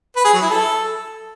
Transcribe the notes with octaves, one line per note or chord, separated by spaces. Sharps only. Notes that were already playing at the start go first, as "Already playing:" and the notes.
B4
G#4
F#3
E4
A4